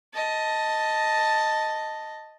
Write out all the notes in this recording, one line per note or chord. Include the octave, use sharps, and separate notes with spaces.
D#5 A5